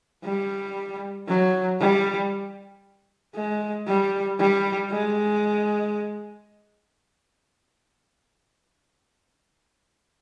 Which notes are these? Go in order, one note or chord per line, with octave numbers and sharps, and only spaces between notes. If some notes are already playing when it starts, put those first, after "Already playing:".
G3
F#3
G3
G#3
G3
G3
G#3